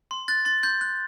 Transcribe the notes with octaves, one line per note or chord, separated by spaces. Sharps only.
C6
F#6 A6
C6 A6
C6 G6
F#6